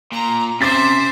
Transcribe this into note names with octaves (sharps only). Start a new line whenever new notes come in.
A#2 A#5
C3 C#4 C5 E5 D6 A6 B6